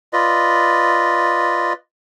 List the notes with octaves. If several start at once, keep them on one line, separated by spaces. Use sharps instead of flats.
F4 B4 D5 D#5